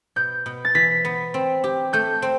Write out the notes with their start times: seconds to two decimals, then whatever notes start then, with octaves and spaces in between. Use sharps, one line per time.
0.16 B2 G6
0.46 B2
0.65 A6
0.75 E3 B6
1.05 B3
1.34 C4
1.64 G4
1.93 A3 G6
2.22 C4